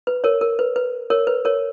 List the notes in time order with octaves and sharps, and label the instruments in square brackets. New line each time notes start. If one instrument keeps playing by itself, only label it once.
[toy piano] B4
A#4 C#5
A#4
B4
B4
A#4 C#5
B4
A#4 C#5